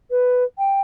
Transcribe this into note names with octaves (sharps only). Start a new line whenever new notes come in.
B4
G5